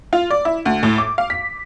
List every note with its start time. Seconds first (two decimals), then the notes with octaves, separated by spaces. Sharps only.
0.13 F4
0.31 D5
0.45 E4
0.66 D2
0.83 A2
0.98 D6
1.18 F5
1.30 B6